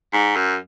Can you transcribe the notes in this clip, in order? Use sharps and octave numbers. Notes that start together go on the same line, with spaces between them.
G#2
F#2